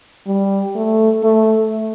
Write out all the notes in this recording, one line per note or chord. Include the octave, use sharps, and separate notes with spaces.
G3
A3
A3